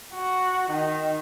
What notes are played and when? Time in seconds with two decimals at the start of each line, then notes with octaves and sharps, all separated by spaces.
0.14 F#4
0.71 D#3